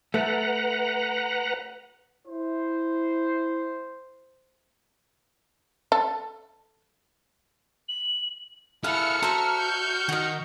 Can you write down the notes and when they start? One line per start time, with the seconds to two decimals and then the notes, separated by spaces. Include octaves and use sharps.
0.14 A3 B4 F#5 A#5
2.27 E4 C5
5.92 A4
7.88 F#7
8.84 E4 G#4 A4 F5 F#5 F6 C#7
9.23 F#4 A4 C5 E5 A#5
9.60 G6
10.09 D#3 F#4 D#5